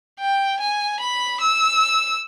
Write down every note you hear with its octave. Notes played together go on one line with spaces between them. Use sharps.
G5
G#5
B5
E6